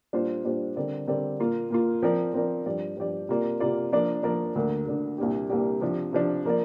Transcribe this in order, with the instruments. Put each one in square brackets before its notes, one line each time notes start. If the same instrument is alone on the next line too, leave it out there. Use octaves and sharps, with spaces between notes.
[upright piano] A#2 G3 D4 F4 C5
A#2 G3 D4 F4 C5
D3 G3 C4 A#4 D5
D3 G3 C4 A#4 D5
A#2 A#3 F4
A#2 A#3 F4
F3 C4 A#4 D5
F3 C4 A#4 D5
G2 F3 D4 G4 D5
G2 F3 D4 G4 D5
C3 A#3 F4 D5
C3 A#3 F4 D5
F3 A#3 D4 A#4 D5
F3 A#3 D4 A#4 D5
D2 D3 A#3 D4 A#4
D2 D3 A#3 D4 A#4
C2 A#2 A#3 D4 G4
C2 A#2 A#3 D4 G4
C3 F3 D4
C3 F3 D4
F3 A#3 D4 A#4 D5